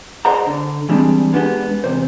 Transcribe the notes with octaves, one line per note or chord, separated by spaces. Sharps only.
G#4 C5 D5 D#5 F#5 A#5
D3
E3 G3 G#3 C4 D4
G#3 B3 D4 G4
E2 C3 C5